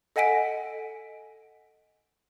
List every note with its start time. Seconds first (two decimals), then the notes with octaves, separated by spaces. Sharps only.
0.16 A4 D#5 F#5 G#5 B6 D7